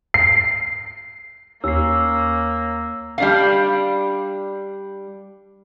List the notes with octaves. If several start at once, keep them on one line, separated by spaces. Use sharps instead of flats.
C7
D#2 A#3 C#4 E6 C7
G3 D4 F5